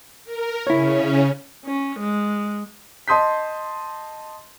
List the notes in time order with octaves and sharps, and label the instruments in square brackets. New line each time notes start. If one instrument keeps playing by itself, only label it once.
[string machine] A#4
[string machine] C#3 C#4 [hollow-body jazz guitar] E4 C#5
[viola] C#4
G#3
[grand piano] D#5 A5 C6 D#6 G6 B6